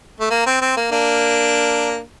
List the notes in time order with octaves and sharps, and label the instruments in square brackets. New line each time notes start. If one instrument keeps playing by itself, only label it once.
[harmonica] A3
A#3
C4
C4
A#3
A#3 D4